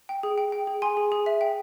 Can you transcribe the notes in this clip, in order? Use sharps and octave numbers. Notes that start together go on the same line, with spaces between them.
G5
G#4
G5
G5
G#4
G#4 G#5 C6
G#4
G#4
E5
G5